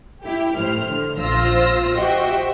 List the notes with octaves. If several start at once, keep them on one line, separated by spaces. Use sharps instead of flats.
E4 G4
A2 C5 F6
D3
A#1 F4 C5 E6 A#6
F#4 G4 C5 D#5 E5 G5